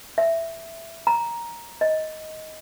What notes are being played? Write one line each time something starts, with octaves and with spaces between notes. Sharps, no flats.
E5
A#5
D#5